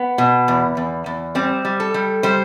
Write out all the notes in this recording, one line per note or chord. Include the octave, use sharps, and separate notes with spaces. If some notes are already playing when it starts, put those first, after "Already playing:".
Already playing: B3
B2
E2
E2
E2
G3 C4
G3
A4
G3
G3 C5